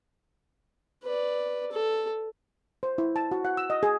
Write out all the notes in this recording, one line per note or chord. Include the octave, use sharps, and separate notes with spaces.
B4 D5
A4
C5
E4
A5
F#4
F#5
E6
D#5
G#4